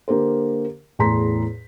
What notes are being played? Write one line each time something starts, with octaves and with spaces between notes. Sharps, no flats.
D3 A#3 G4 A#4 C5
E2 A2 G#4 A#5 C6 B6